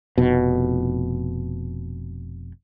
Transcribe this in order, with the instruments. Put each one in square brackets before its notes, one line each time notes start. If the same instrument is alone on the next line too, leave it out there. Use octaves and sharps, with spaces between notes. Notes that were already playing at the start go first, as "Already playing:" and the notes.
[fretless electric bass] F1 B2